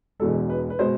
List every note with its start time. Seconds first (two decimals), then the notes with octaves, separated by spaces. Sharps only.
0.20 E1 E2 B2 G#3 A4
0.50 B4
0.70 B4
0.79 B2 G#3 C5